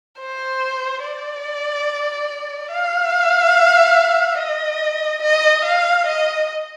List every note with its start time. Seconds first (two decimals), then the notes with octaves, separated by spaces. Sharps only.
0.20 C5
1.04 D5
2.72 F5
4.39 D#5
5.22 D#5
5.64 F5
6.06 D#5